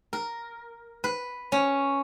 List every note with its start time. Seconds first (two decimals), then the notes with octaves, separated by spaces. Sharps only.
0.13 A#4
1.04 B4
1.52 C#4